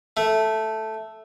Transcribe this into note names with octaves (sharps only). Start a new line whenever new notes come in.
A3